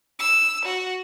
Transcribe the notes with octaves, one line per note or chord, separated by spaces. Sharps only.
E6
F#4